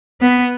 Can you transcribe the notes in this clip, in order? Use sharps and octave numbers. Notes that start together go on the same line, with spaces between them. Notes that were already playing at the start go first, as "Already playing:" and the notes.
B3